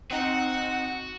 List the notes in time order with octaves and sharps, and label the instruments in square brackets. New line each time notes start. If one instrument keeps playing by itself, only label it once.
[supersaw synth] C4 D#4 [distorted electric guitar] F#4 [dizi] F#5